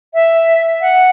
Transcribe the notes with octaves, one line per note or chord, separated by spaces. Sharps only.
E5
F#5